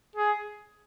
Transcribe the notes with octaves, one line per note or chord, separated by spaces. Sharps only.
G#4